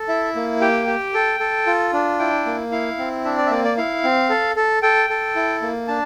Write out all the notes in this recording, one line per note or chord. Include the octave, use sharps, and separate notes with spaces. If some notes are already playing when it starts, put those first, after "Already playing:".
Already playing: A4
E4 E5
A#3
G4 G5
G4
A4
A4
F4
D4
E4 G5
A#3
E4 F5
C4
D4 E5
D5
E5
A#3 D5
D5
E4 F5
C4
A4
A4
A4 G5
A4
E4
A#3
D4 A5